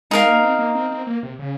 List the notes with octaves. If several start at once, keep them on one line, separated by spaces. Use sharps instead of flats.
G#3 D#4 A#4 F5
A#3
C4
A#3
C4
C4
A#3
C3
C#3